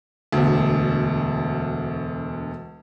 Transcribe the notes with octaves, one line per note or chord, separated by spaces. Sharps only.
E1 D2